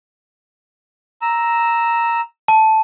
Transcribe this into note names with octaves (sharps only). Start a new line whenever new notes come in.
A#5 E6
A5